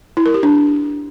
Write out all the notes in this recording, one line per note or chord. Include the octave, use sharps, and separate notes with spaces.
E4
A#4
G4
D4